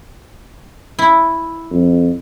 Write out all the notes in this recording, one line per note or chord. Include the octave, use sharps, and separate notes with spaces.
E4
F2